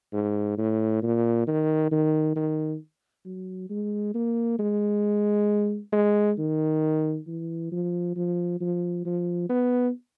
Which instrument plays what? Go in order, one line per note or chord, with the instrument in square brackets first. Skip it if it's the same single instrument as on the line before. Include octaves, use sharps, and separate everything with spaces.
[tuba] G#2
A2
A#2
D#3
D#3
D#3
F#3
G#3
A#3
G#3
G#3
D#3
E3
F3
F3
F3
F3
B3